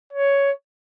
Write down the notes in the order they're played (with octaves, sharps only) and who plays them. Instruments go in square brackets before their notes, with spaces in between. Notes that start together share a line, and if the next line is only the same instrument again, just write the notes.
[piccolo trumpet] C#5